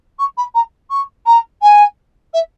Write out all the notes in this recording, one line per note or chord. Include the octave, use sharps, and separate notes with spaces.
C#6
B5
A#5
C#6
A#5
G#5
E5